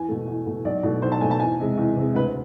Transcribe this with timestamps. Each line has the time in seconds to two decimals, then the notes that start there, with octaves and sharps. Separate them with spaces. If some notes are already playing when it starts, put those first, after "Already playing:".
Already playing: E2 G#5
0.08 B2 A3
0.27 E2
0.46 B2 A3
0.65 B1 D5
0.83 B2 A3
1.02 B1 C5
1.12 A5
1.21 B2 A3 G#5
1.31 A5
1.40 E2 G#5
1.60 C3 G#3
1.77 E2
1.96 C3 G#3
2.15 D2 B4